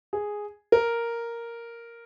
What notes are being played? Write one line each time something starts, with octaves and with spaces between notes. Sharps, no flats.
G#4
A#4